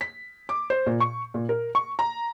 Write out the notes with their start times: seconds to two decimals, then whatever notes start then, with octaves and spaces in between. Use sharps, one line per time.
0.01 B6
0.49 D6
0.70 C5
0.86 A#2
1.00 C#6
1.34 A#2
1.49 A#4
1.75 C#6
1.99 A#5